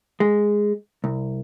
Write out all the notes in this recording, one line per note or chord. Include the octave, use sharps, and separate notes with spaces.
G#3
C2